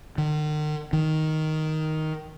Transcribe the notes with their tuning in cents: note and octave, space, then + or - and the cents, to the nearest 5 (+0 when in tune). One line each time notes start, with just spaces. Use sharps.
D#3 -45
D#3 +5